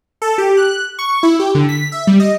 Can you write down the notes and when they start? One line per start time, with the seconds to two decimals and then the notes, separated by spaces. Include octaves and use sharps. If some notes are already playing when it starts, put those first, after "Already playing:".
0.22 A4
0.38 G4
0.57 F#6
0.99 C#6
1.23 E4
1.40 G4
1.55 D3
1.69 B6
1.92 E5
2.07 G3
2.20 D#5